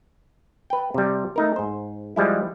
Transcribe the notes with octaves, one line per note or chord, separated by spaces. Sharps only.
B4 G5
C3 G3
A3 D#4 A#4
G#2 C5
F3 G3 G#3 E4